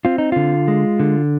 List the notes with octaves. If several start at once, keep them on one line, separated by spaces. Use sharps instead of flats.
C4 F4
D#4
D3 F4
G#3
D3